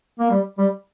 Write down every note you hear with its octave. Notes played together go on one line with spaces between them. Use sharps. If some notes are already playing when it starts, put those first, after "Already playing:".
A#3
G3
G3